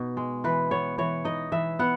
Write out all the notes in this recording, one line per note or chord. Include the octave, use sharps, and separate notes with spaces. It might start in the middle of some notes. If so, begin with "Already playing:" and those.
Already playing: B2 D#4
G#3
E3 B4
B3 C#5
E3 C#5
D#4 D#5
E3 E5
B3 F#5